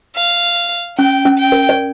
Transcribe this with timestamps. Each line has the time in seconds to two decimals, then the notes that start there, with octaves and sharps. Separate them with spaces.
0.16 F5
0.98 C#4 G5
1.25 C#4
1.38 G5
1.52 A#4
1.69 D5